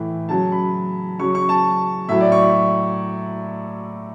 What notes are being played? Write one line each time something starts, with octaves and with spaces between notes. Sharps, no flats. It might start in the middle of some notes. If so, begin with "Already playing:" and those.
Already playing: A2 E3
C#3 F#3 A5
B5
C#3 F#3 C#6
C#6
A5
A2 F#3 E5
D5
C#6